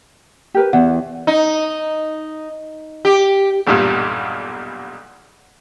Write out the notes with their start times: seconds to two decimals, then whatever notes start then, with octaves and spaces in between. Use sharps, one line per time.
0.54 G4 A#4 B4
0.73 E2 F#5
1.27 D#4
3.05 G4
3.67 B1 E2 G2 A#2 G3